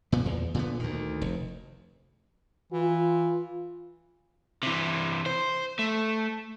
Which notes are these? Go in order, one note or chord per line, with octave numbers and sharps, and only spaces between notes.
A#2 B3
E2
A#2 D3 B3
D2 D#3
F1
E3 F4
C3 E3
C5
A3